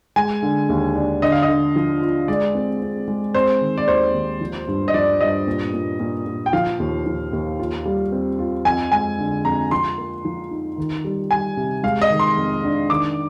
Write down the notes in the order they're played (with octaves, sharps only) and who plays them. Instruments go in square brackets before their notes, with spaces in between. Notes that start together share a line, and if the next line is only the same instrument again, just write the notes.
[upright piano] G#3 [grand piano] G#5
[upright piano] D3
D#2
D4
[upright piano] D3 [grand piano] D#5
[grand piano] F5
D#5
[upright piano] D3
F3
F4
[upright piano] G#3 [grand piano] D5
[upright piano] C4
C4
G#3
[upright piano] C4 [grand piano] C5
[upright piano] D#3
[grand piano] D5
[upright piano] D#2 [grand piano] C5
[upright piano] D#2
F3
G2
[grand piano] D#5
[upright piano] F3 [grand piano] D5
[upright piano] G2 [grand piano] D#5
[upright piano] A#2
A#2
A#2
A#2
[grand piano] G5
[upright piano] F3 [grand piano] F5
[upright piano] D#2
F3
D#2
F4
G3
C4
F4
[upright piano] F2 [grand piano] G#5
[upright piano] G#3 [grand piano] G#5
[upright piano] D3
[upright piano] F2 [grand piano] A#5
[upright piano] F3 [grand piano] C6
[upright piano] A#3
F3
D#4
D#3
G3
[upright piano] G3 [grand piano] G#5
[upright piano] C3
[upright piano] G#3 [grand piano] F5
[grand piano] D#5
[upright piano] D#3
[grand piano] C6
[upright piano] F2
D4
[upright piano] D#3 [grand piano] D6